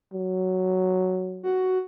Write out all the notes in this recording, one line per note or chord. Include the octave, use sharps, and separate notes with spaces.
F#3
F#4